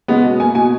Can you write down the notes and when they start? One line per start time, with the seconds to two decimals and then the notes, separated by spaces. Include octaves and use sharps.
0.08 C#3 G#3 B3 D#5
0.24 B2 D#5
0.40 A#3 G#5
0.55 B2 G#5